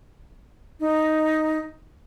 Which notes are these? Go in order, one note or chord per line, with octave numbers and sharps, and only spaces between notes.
D#4